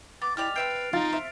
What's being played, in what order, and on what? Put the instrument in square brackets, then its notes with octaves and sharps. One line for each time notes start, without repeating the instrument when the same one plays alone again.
[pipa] B3 [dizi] D6 [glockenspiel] A6
[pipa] G#3 G4 D5 [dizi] E4 [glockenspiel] F6 F7
[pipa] C4 E5 G5 [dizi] B4 [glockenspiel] F6 C7 D7
[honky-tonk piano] F3 F5 A6 [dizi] D#4 [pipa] C6
[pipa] C5 [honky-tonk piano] E5